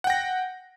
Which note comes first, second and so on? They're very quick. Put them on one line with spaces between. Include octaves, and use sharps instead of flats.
F#5 G5 A#6